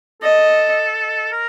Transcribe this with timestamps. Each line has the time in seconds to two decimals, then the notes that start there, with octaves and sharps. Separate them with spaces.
0.22 A4 D#5
1.32 A#4